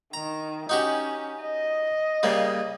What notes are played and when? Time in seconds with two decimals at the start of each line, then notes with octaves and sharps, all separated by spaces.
0.13 D#3 A#5
0.69 C#4 D#4 F#4 G4
1.43 D#5
2.23 C#3 G3 A#3